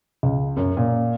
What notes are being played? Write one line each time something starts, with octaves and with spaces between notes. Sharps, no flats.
C#2
F#2
A#2